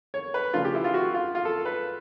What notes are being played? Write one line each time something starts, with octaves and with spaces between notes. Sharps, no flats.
C#5
B4
C#3 F3 A3 D4 F4
G4
E4
F4
F#4
F4
F4
A4
B4